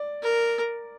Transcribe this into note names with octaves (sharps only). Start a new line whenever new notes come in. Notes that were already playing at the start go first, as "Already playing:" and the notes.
Already playing: D5
A#4